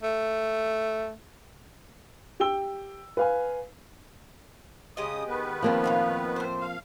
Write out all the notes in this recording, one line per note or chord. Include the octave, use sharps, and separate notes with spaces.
A3
G4 G5 E6 G7
B4 F5 G#5
C#3 G#3 G4 D#5 D#6
D#3 B3 B4
F3 A#3 C4
A2 G3 F5
A2 C5
F5